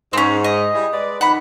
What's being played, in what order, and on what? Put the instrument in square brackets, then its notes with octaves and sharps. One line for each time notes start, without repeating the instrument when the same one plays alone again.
[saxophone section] G#2 [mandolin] C4 C#4
[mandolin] D#5
[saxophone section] G3 E4 G#4
G#3 B4 D5
[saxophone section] F2 D#3 [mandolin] F#5 B5